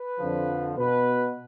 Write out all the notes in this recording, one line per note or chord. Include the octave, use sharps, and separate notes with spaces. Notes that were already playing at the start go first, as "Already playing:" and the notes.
Already playing: B4
F2 D3 F3
B2 B4